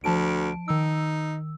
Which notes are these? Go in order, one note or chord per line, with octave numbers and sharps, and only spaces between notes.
D2 F3 A5 D7
D#3 D#4 E6